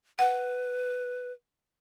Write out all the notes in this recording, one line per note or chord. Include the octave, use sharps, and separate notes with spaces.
B4 F#5